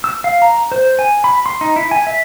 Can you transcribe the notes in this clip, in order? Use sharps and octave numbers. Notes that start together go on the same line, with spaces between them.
E6
F5
A#5
C5
G#5
B5
C6
D#4
E4
G#5
E5